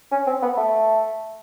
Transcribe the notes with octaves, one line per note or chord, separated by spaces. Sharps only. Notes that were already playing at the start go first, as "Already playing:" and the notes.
C#4
C4
B3
A3